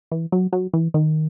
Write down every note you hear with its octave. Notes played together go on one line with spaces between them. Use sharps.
E3
F#3
F#3
E3
D#3